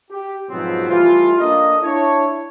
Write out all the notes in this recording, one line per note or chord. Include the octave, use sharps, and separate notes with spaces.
G4
G#2 B2 F3 F#3 B3 C4
E3 G3 A3 F4
A#3 D4 A4 D#5
D4 E4 C#5